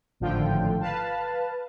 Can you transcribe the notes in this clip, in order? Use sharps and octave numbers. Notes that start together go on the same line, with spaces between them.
G#1 A2 D3 F3 F4 G5
B4 F5 A5